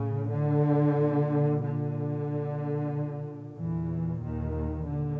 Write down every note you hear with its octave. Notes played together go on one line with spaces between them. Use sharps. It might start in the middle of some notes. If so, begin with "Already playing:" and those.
Already playing: A2 C#3
D3
A#2
D3
A#2
E2 A#2 E3
D#2 D#3
A#2 D3